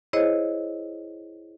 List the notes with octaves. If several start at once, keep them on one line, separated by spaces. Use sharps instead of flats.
E4 G#4 C5 C#5 D#5